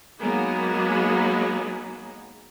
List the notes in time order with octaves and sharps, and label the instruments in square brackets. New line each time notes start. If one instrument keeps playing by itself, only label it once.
[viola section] F#3 G#3 A#3 B3 D#4 G#4